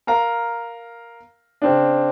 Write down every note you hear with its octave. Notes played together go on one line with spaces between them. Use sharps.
A#4 F5 A#5
C#3 C4 D4